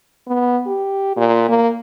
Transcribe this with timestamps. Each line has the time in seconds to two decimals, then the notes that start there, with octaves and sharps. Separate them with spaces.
0.27 B3
0.67 G4
1.17 A#2
1.49 A#3